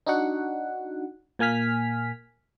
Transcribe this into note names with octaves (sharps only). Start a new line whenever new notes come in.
D4 D#4 F#4 F#5
A#2 A#3 G#5 F6 B6